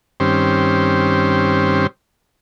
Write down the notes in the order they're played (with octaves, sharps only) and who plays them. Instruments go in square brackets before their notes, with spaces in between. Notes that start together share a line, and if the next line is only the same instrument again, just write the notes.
[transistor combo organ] G2 D#3 C4 C#4 G4 C5